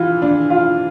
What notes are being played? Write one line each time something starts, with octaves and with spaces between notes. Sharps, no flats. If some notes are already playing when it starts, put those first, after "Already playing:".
Already playing: E3 F4
D4
F4